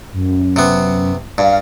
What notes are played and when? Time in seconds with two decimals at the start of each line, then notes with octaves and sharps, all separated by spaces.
0.13 F#2
0.56 C3 B3
1.38 G2 F5